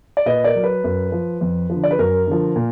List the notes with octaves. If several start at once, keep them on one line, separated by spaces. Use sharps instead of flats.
D5
A#2 B4 D#5
A#4 D5
F#3
B4
F#2
F3
F2
D3 F3
D5
B4
F#2 A#4
D3 F3
A#2